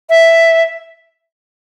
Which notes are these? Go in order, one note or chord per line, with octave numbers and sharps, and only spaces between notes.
E5